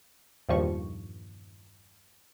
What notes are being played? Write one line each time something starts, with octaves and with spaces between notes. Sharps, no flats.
E2 G2 A#2 D#3 F3 C#6